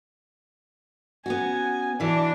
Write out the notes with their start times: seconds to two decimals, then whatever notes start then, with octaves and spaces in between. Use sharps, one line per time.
1.26 B3 C#4 F#4 G#5
2.00 B2 E3 D4